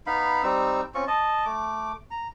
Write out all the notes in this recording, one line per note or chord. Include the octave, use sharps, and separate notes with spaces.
B3 D#4 F5 B5
G3 C4 D#4 E6
C4 C#4 F4 C#6
D#5 A5
A3 D6
A#5